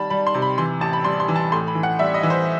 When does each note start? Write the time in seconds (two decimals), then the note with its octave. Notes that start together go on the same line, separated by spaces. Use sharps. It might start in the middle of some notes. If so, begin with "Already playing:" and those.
Already playing: D#3 G3 A5 B5
0.10 G3 B5
0.27 C6
0.34 C3
0.42 B5
0.58 E3 C6
0.81 A1 A5
0.93 B5
1.04 G3 C6
1.20 C6
1.28 E3
1.36 A5
1.52 A2 C6
1.67 B5
1.75 E3
1.83 F#5
1.99 G3 E5
2.14 D#5
2.23 E3
2.30 C5